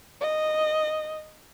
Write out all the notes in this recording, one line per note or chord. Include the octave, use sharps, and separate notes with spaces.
D#5